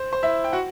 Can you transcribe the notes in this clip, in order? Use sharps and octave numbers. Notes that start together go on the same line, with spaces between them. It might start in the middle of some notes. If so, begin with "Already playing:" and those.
Already playing: C5
C5
E4 E5
G5
F#4 F#5